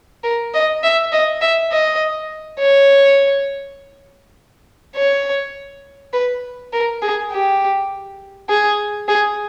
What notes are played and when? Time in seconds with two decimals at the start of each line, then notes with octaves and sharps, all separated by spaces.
0.24 A#4
0.54 D#5
0.83 E5
1.12 D#5
1.41 E5
1.71 D#5
2.59 C#5
4.96 C#5
6.13 B4
6.73 A#4
7.02 G#4
7.31 G4
8.49 G#4
9.08 G#4